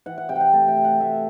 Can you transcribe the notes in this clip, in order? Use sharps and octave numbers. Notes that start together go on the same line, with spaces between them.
E3 F#5
F#5
C3 G5
F#5
G5
A3 A5
G5
C3
F#5
A3 E5